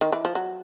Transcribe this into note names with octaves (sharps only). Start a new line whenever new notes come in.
D#3
E3
F3
F#3